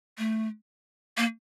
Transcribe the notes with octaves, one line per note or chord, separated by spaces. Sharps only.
A3
A#3